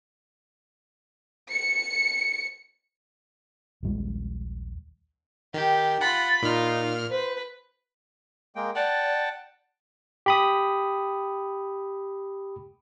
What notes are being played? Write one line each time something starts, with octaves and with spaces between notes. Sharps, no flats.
C#7
A#1 D#2 G3 G#3
D#3 G4
F4 F#5 B5 A6
A#2 D#4 F4 F6
B4 C5
G#3 A#3 G5
D5 F#5 G5 A5
G4 B5 D#6